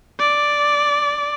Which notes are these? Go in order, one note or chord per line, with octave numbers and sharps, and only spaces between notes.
D5